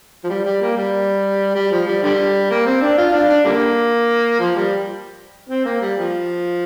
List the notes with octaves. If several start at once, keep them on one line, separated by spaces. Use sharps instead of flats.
F3
G3
G3
A#3
G3
G3
F3
G3
D3 G3
A#3
C4
D4
F4
D4
D4
D3 G3 A#3
F3
G3
C4
A#3
G3
F3